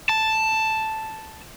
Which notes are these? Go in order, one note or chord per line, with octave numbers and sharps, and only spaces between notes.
A5